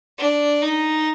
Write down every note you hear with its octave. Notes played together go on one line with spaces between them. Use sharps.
D4
D#4